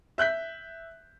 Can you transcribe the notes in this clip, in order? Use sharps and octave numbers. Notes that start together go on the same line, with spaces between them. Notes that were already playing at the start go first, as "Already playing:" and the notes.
E5 F#6 G6 B6